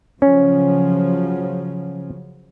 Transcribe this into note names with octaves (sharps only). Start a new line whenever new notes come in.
C#3 F3 F#3 C#4